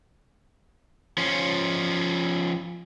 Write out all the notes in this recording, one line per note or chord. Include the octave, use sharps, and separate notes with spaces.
F3 C#4